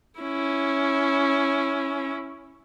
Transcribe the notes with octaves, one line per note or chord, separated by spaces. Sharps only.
C#4 E4